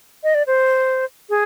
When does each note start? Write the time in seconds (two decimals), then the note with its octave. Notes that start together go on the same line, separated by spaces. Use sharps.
0.24 D#5
0.35 D5
0.47 C5
1.30 G#4